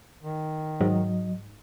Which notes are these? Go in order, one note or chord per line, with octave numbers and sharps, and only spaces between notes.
D#3
G#2 F#3 D#5